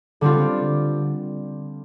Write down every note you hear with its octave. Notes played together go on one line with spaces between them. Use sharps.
D3 G3 C4 F4